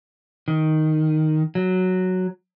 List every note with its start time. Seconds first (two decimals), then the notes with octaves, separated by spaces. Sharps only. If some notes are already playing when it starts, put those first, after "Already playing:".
0.48 D#3
1.55 F#3